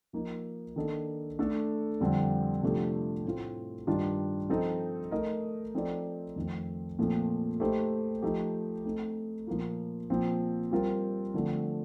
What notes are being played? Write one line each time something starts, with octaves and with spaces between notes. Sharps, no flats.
F3 A#3 D#4
D#3 A#3 D4 A4 D#5
A3 D4 A4
F2 D3 G3 C4
C3 F3 A3 D4 G4
A2 A3 C4 F4
G2 D#3 G3 D4 F4
F3 C4 D#4 A4
A3 D#4 A#4 D#5
F3 C4 D#4 A4 D5
F2 D#3 A3 C4
A#2 F3 A3 C4
A3 D#4 G4 C5
F3 A3 D#4 G4
A3 C4 D#4
A#2 F3 A#3 F4
A#2 F3 C4
G3 C4 F4 A#4
D3 F3 A3 C4